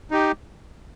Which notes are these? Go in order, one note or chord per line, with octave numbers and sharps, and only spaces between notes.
D#4 G4